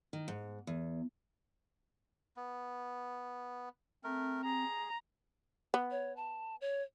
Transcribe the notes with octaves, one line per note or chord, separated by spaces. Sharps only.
D#3
G#2
E2
B3
A3 C4 A#4
G#4 A#5
B3
C#5
A5
C#5